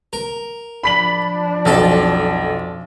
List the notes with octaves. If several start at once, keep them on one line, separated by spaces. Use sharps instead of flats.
A#4
F3 D4 B5 B6 F#7
B1 F2 A4 A5